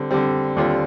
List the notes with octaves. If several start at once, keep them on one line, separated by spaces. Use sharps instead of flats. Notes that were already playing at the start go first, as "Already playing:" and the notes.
Already playing: D3 G3 C4
D3 G3 C4
D#2 D3 G3 C4 F4